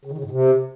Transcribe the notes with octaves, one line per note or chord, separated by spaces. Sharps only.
C#3
D#3
C#3
G#2
C3